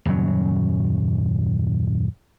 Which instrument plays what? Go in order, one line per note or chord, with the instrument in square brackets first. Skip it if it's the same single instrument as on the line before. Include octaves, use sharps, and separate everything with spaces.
[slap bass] D#1 F#2 C#3 F#3